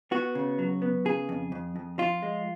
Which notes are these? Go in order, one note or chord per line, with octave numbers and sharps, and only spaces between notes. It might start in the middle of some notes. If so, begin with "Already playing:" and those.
B3 F#4
C#3
F#3
B3
C#3 G#4
F2
F2
F2
F3 F4
G#3